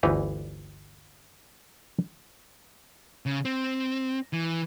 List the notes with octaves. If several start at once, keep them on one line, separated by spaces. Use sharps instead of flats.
G1 D2 E3 D#4 B4 A#5
C#3
C4
E3